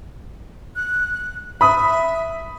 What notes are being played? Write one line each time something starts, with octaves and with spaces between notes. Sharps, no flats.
F#6
E5 B5 D#6